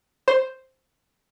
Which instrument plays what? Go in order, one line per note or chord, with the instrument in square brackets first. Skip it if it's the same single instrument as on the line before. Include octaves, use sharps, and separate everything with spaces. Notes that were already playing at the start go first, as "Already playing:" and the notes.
[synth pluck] C5